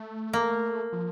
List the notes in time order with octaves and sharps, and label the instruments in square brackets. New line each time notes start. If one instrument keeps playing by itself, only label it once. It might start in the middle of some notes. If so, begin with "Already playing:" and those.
Already playing: [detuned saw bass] A3
[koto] A#3
[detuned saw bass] F3